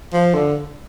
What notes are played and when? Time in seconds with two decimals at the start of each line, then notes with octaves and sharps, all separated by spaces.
0.13 F3
0.34 D3